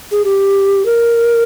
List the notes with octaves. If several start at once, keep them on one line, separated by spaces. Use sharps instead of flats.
G#4
G4
A#4